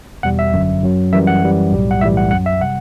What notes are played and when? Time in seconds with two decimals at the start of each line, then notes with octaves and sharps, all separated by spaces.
0.23 E2 B2 G3 F#5
0.39 E5
0.53 G1 F#2 D3 F#3
0.83 F#2 F#3
1.12 F#2 E3 G3 E5
1.27 F#5
1.43 F#2 E3 G3
1.72 B1 A2 G3
1.91 F#5
2.01 B1 A2 E3 G3 E5
2.17 F#5
2.31 F#2 F#3 F#5
2.46 E5
2.61 C3 G3 F#5